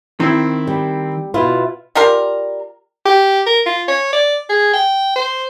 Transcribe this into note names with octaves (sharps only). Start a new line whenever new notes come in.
D#3 C4 E4
G3
B2 E4 F4
G3 F4 A#4
G4
A#4
F4
C#5
D5
G#4
G5
C5